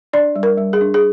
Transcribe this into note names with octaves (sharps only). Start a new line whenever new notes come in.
D4 D5
G3
A#4
G3
G#4
D4
G#4